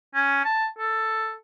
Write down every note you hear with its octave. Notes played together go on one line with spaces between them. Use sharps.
C#4
A5
A4